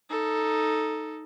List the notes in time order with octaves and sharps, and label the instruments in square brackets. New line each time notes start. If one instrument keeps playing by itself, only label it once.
[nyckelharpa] D#4 A4